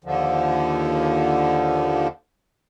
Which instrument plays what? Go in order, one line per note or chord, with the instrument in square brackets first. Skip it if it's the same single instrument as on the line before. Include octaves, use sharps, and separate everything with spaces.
[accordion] D#2 D3 F3